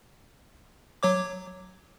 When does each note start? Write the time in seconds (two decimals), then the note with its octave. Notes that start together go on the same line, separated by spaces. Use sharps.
1.03 F#3 C#5 D6